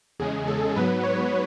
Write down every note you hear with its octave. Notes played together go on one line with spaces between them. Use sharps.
E2 C#3 G#3 G#4
A4
G#2 F#3 B3 B4
C#5